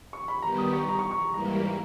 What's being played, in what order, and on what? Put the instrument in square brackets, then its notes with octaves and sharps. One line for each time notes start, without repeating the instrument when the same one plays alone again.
[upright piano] C#6
B5
[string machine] D#3 G3 B3 G4 [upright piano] A#5
[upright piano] D#6
C#6
A#5
C#6
C#6
[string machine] G#2 E3 G3 A#3 E4 [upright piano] A#5